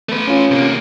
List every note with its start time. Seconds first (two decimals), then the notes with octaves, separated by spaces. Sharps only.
0.09 A3 B4
0.28 C#4 F4
0.51 C3 A#3